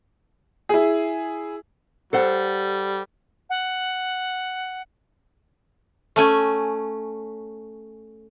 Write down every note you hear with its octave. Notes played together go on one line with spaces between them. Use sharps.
E4 G#4
G3 A4 C5 F#5
F#5
A3 C#4 G#5